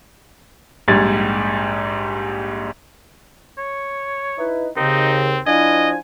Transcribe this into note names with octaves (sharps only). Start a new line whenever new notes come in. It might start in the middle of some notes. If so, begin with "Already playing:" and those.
A#1 G#2 G3 G#6 A6
C#5
D#4 E4 B4
D#2 C#3 C4 D#4
F3 D4 E4 D#5 G#5